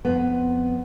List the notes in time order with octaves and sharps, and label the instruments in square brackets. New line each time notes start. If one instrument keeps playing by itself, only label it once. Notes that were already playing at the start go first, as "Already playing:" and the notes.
[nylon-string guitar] F2 B3